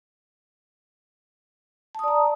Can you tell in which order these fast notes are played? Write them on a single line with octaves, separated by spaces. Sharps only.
A5 D#6 D5 A#5